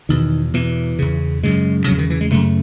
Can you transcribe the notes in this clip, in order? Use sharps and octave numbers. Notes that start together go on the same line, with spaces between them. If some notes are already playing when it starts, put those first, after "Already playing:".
E2 B2 D#3
E2 B2 E3
E2 C#3
F#2 C#3 G#3
E2 C#3 F#3
D#3
E3
G#3
F#2 C#3 A3